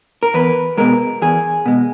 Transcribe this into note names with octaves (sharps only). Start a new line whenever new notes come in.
A#4
E2 B4
B2 G#3 A#4
E2 G#4
B2 G#3